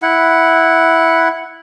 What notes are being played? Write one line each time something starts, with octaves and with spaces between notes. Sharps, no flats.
E4 F#5